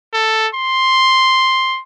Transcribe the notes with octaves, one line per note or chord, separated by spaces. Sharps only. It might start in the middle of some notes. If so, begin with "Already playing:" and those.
A4
C6